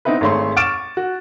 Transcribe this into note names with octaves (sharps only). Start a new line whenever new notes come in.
B3 C4 D#4 E4 B4
G#1 G#3 A3 C#5 C6
C#6 D6 F6 A6 D7 E7
F#4